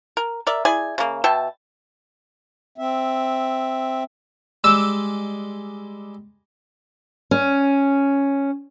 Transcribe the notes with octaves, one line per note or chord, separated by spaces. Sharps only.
A#4
A#4 D5 E5
E4 G#4 D5 G#5
C#3 A#3
B2 E5 G5 A5
C4 E5
G3 G#3 D5 E6
C#4